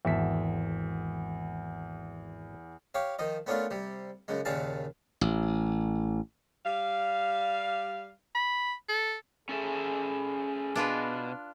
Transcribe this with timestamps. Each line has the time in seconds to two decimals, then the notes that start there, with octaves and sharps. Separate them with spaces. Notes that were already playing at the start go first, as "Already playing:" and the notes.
0.05 G#1 E2 E5 A5 B6
2.94 G4 C#5 F5
3.19 D#3 F3 D#5
3.46 A3 B3 C#4 D4 F4 A#4
3.71 C3 G3
4.28 F#2 C#3 G#3
4.45 D#2 A#2 C#3 G#4 F5 A5
5.21 A1
6.66 G3 F5
8.35 B5
8.88 A4
9.49 C#4 G#4 A4 E5
10.76 B2 D4 F4 B4